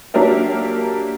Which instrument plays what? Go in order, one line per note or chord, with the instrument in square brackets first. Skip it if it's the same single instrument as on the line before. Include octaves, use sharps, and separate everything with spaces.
[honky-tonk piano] F#3 A#3 D4 G4 A#4 E5